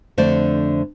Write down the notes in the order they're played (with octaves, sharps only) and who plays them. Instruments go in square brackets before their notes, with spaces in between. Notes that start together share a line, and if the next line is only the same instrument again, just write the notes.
[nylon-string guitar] F2 D3 A3 C5 D5